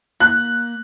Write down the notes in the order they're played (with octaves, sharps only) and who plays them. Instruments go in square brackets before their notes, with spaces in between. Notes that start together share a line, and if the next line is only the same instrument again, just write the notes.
[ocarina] A#3 [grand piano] F#6